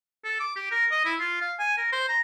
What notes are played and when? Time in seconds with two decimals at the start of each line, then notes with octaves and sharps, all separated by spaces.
0.24 A4
0.40 D6
0.56 G4
0.71 A#4
0.91 D#5
1.05 E4
1.20 F4
1.41 F5
1.59 G#5
1.77 A#4
1.92 C5
2.09 A#5